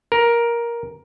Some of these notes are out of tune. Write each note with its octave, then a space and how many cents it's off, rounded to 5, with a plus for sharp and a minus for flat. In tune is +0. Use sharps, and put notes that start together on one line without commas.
A#4 +10